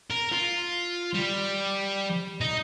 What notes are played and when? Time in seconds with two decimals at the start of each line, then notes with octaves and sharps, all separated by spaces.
0.10 A#4
0.32 F4
1.14 G3
2.41 D#4